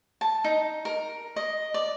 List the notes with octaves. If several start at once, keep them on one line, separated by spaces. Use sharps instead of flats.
A5
D#4
A#4
D#5
D5